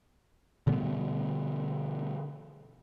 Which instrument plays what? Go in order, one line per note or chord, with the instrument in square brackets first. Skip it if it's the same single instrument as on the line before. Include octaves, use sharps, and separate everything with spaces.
[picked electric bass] B2 D3 G3 B3